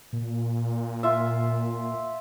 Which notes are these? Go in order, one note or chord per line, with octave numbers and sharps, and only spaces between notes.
A#2
F4 E5